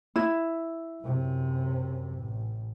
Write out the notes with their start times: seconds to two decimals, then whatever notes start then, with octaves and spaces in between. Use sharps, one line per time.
0.16 E4
1.03 F#2 C3
2.15 A1